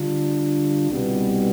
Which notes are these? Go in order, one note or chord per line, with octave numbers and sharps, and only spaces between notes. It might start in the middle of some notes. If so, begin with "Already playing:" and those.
Already playing: D3 G3 D4 F4
C2 B2 G3 B3